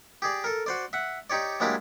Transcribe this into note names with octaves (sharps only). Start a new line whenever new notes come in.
G4 G#4 D5
A4 A#4
F#4 C5 D5
E5 F#5
D#4 G4 C#5 D5
F#3 G#3 A#3 D4 E4 G4